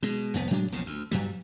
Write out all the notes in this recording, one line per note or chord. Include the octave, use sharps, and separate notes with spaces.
B2 G#3
C2 F2 B3
A2 F#3 G#3 D4
A#1 E2 A#2 C#3
D2
G2 F#3 G3